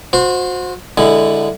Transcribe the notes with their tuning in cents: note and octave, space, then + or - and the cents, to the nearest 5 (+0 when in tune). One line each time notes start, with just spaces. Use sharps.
F#4 -30 C5 +0
D3 +0 G#3 -20 E4 +0